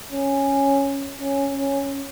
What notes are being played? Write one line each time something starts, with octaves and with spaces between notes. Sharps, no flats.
C#4
C#4
C#4